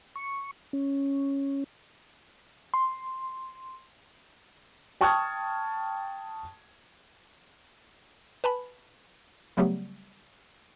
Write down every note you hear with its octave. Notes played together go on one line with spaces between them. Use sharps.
C#6
C#4
C6
G5 A5 C#6 D#6 F6 G#6
B4 G#5 A5 B5
C#3 F#3 G3 A3 B3 G4